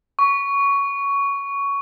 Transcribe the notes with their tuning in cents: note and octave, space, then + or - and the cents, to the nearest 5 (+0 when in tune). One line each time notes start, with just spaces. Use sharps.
C#6 +15